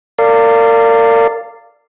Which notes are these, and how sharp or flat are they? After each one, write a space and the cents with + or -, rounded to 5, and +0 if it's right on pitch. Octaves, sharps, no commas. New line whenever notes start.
A#4 -35 D5 +0 F5 -10